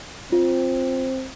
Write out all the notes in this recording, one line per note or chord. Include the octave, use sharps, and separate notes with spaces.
C4 F4